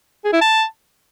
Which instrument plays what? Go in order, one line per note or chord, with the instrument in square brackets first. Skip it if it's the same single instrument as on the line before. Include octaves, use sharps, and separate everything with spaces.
[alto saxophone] G#4
E4
A5